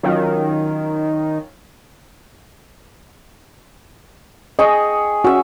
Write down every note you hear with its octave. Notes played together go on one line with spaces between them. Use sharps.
D#3 F#3 C#4 F4
G#4 D#5 G5 C#6
C#4 F#4 E5